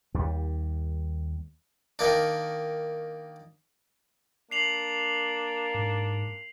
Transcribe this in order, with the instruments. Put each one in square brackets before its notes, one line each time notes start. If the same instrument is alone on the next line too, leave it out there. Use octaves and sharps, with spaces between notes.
[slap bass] D#2 G3
[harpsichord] D#3 A#3 D4
[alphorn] A#3 [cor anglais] D4 [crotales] C7 F7 F#7
[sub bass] G#2